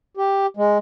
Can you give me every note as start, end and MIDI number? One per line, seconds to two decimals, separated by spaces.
0.17 0.46 67
0.57 0.78 56